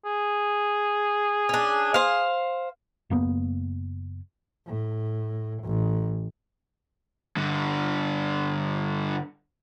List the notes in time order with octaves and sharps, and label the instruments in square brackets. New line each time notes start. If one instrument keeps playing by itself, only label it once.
[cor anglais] G#4
[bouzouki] C#4 D4
C5 F5
[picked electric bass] F#1 A#3 B3
[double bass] A2
A1
[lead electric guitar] G2 D3